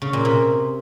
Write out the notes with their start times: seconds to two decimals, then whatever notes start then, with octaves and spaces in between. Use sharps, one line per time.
0.02 C#3
0.13 A#2
0.25 C3